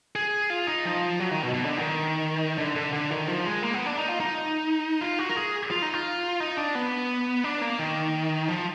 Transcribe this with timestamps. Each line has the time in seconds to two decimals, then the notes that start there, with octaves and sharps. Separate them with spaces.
0.15 G#4
0.50 F4
0.67 D#4
0.85 F3
1.20 F#3
1.31 D#3
1.43 B2
1.54 B2
1.66 D3
1.77 D#3
2.58 D3
2.76 D3
2.93 D3
3.10 D#3
3.28 F3
3.45 G#3
3.63 A#3
3.74 B3
3.86 D4
3.97 D#4
4.09 F4
4.20 D#4
5.01 F4
5.19 F#4
5.29 A#4
5.36 G#4
5.71 F4
5.82 D#4
5.94 F4
6.40 D#4
6.57 D4
6.75 B3
7.44 D4
7.62 A#3
7.79 D#3
8.48 F3